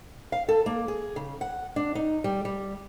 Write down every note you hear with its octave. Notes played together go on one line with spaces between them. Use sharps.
F5
A4
A#3
G#4
C#3
F#5
D4
D#4
G3
G3